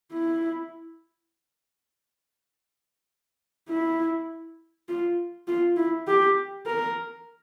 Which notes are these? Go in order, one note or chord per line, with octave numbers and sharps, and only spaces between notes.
E4
E4
F4
F4
E4
G4
A#4